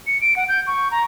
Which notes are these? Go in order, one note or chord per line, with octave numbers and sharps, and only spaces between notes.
C#7
D7
F#5
G6
C#6
A#5